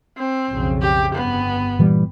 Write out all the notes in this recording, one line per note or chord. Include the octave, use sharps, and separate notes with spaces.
C4
B1 F2 C#3
G4
G1 B3
A#2 E3 G3